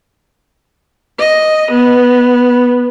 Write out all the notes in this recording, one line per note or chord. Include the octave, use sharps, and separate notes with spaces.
D#5
B3